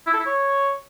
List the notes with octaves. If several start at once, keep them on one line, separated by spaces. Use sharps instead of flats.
E4
A4
E4
C#5